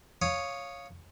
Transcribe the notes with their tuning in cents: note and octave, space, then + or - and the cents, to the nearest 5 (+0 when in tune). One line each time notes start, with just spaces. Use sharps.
C#5 +0 F5 +0 D#6 -10